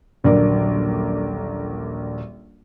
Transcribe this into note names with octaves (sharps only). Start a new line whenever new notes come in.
D#1 A#1 D3 F#3 A#4 D5